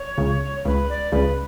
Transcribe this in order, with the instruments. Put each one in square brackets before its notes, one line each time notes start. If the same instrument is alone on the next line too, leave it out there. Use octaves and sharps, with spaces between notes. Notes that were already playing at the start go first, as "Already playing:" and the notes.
Already playing: [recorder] C#5
[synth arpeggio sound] C#2 C#3
[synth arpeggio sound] C#2 C#3 [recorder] B4
[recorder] D5
[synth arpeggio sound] C#2 C#3 [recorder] B4